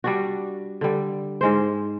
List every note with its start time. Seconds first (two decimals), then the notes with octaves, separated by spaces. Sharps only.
0.04 G3 D4 F#4
0.81 D3 G3
1.41 G#2 G#3 C5